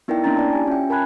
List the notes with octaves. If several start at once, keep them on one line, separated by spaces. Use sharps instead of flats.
B3 D#4 E4 A#4 D5 G5
A#3 C#4 D4 G5 A#5 A6
E4 D5 A5
G4 G#5
C#4 F4 E5 G5
A#4 G#5 A5 B5 F#6 G#6